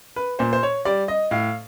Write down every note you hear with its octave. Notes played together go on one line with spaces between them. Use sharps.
B4
A#2 C5
C5
C#5
G3 D5
D#5
A2 F5